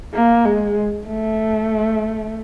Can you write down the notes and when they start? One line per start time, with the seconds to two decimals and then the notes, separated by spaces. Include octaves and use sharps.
0.14 A#3
0.45 G#3
1.07 A3